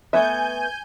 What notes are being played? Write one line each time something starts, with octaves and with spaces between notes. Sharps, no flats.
A3 B3 E5 G#5 G6